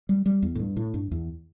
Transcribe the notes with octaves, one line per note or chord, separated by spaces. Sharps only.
G3
G3
E2
A2
G2
A2
G2
E2